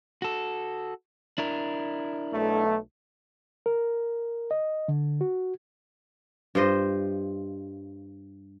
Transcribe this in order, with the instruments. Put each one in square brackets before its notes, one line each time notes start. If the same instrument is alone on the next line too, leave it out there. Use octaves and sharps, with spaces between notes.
[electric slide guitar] F#4 A4
D4 E4 A#4
[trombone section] B1 A3
[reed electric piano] A#4
D#5
D3
F#4
[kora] G2 F4 C5 D#5